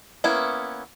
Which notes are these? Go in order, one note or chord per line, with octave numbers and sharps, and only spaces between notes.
A#3 B3 C#4 E4